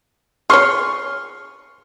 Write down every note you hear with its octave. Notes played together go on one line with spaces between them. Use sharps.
G#4 C#5 C6 C#6 F6